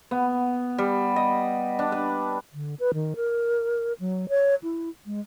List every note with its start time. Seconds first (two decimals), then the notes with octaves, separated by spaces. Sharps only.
0.11 B3
0.78 G3
1.16 D#5
1.79 D4
1.92 B4
2.54 D3
2.80 B4
2.94 D#3
3.16 A#4
4.00 F#3
4.29 C#5
4.63 E4
5.06 G#3